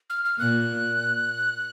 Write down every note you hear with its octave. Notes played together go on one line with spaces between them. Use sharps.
F6
F6
A#2 F#6